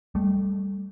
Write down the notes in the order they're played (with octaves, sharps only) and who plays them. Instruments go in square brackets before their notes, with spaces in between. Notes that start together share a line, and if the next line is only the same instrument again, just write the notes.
[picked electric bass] G3 A3